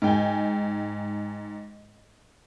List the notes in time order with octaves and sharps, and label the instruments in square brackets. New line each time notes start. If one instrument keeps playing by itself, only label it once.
[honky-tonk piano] G#2 G5 G#5